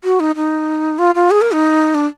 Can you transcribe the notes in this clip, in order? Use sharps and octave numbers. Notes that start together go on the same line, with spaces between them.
F#4
D#4
D#4
F4
F4
G#4
A#4
D#4
D4